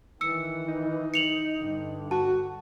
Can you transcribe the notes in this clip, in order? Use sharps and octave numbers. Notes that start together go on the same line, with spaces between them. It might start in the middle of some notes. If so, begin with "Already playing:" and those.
D#3 E3 E6 C#7
D#4
C#7 F7 F#7
G2 D3
F#4 A5